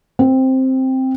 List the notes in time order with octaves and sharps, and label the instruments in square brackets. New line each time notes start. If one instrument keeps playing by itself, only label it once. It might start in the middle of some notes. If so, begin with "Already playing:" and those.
[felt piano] C4